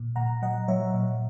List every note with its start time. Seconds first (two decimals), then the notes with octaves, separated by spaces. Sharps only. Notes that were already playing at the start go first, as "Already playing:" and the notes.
Already playing: A#2
0.16 A#2 F#5 A#5
0.42 F#3 D#5 F#5
0.68 F#3 C#5 E5
0.94 A#2